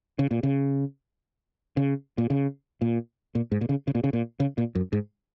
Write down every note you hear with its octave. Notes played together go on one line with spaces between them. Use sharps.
C#3
A#2
C#3
C#3
A#2
C#3
A#2
A#2
G#2
A#2
C#3
C#3
A#2
C#3
A#2
C#3
A#2
F#2
G#2